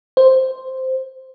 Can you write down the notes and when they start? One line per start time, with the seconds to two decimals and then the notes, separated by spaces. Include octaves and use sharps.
0.17 C5